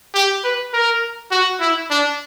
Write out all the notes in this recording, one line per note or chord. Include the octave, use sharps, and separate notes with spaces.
G4
B4
A#4
F#4
E4
D4